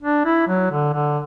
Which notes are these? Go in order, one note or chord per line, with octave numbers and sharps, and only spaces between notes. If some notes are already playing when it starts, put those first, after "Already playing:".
D4
E4
F#3
D3
D3